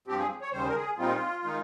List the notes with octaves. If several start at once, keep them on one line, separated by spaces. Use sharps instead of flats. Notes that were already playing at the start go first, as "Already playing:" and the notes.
G2 F3 C4 G4
G#4
C#5
D#2 C#3 G3 C5
A#4
G#4
A#2 G3 C4 D#4 F4
D#3 G#3 D#4